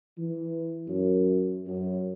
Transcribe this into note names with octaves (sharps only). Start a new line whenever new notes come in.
E3
F#2
F#2